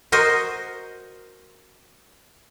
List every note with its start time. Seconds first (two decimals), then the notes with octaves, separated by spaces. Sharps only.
0.12 F#4 A#4 C5 D#5